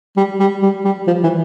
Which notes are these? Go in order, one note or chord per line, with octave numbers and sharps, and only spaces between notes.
G3
G3
G3
G3
F3
E3